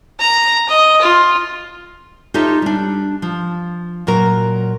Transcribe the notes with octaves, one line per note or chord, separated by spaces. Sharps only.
A#5
D#5
F4
D#4 F4 G4 A4 C#5 E5
G3 D4
F3
A#2 F#3 A#4